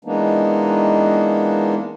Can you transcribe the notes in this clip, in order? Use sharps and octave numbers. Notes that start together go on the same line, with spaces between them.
E3 G#3 A#3 B3 D4 D#4